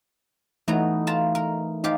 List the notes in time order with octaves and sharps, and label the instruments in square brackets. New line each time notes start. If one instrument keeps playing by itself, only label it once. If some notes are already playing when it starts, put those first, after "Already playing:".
[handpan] E3 A3 D#4 [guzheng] F#3 B3 A#5
[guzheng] F4 A5 A#5
A#4 A#5
[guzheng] F3 G4 F5 [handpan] D#4